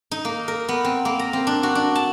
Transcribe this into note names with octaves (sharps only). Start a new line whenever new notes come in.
D#4
A#3
A#4
B3
C4
A#3
A#5
C4
D4
F#4
D4
A5